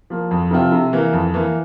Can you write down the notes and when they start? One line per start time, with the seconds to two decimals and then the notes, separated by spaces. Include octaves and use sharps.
0.10 F3 A#3
0.31 F2
0.51 C3 F3 C4 F4
0.72 C3
0.93 E3 A#3
1.13 F2
1.34 E3 A#3